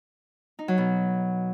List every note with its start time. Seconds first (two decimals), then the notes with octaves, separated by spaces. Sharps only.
0.59 D#4
0.68 F#3
0.78 B2